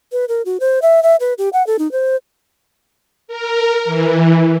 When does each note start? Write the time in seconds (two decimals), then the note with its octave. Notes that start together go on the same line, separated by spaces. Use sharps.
0.12 B4
0.28 A#4
0.45 F#4
0.60 C5
0.82 E5
1.03 E5
1.20 B4
1.38 G4
1.53 F#5
1.67 A4
1.79 D#4
1.92 C5
3.28 A#4
3.85 E3